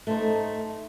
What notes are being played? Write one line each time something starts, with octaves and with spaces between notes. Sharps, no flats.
A3 D#4 C5